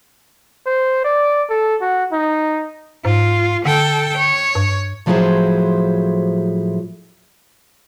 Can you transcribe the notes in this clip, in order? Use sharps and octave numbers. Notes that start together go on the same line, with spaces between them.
C5
D5
A4
F#4
D#4
G#2 F4
D3 A4 G5
C#5
G2
A2 F3 F#3 E4 G#4 C5